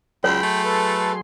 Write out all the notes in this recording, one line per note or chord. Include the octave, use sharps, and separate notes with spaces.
C#2 F#3 G#4 C#5 G5 B5 C6
A3
A4 B4